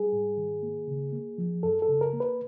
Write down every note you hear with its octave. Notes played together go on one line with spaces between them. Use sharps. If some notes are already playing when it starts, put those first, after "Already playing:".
Already playing: G3 G#4
G#2
D#3
A#3
C#3
A#3
F3
F#2 A4
A4
C#3
A#4
A#3
B4